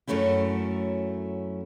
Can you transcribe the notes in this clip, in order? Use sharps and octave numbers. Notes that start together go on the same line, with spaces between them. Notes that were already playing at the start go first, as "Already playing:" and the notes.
F#2 F#3 A3 C#4 E4